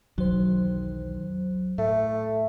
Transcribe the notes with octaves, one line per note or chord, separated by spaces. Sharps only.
B1 E2 D#3 F#3 C5
A2 A3